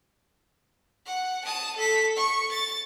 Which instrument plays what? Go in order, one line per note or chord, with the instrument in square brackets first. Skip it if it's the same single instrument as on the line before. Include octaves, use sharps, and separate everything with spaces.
[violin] F#5
A5 D#6
A4 B6
C#6
A6